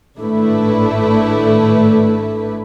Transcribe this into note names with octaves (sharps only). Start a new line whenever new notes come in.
G#1 A2 A3 D4 E4 B4